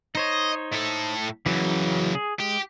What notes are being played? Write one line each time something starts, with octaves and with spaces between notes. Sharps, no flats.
D#4 C5 C#5 D#5
A2 A4
F#2 C#3 E3 F#3
G#4
G#3 G4